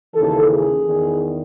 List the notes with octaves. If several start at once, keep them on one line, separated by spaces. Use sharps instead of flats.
D#2 C#3 E3 A4
G#4
E2 D#3